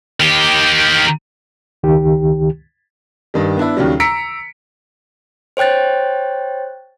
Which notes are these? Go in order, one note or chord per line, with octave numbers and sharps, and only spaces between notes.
D#3 G4
C#2 D#3 G4
G2 D#3 G3
B3 D4 E4
D#2 C#3 F#3 G3
A#5 E6 B6 C#7 D7
C5 C#5 G5 F#6 A6